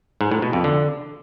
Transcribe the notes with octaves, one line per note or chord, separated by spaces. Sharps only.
G#2
A2
B2
F2
D3